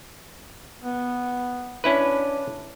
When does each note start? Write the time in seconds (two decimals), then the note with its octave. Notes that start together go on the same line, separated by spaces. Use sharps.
0.83 B3
1.84 C#4 D4 E4 B4